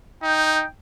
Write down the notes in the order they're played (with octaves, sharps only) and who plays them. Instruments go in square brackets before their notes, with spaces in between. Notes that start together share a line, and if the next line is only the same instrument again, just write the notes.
[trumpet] D#4 [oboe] G5